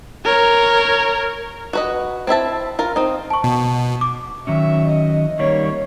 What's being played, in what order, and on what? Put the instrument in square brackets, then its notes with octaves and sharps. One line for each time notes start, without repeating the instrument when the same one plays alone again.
[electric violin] A#4 C#5
[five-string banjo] F#4 B4 D#5
C4 E4 E5 A5
F4 A#4
C4 D#4
[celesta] A5 C#6
[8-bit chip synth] B2
[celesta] D6
[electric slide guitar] D#3 F#3 C#4 [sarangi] E5
[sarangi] D#5
[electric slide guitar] D#3 G3 A#3 [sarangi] C#5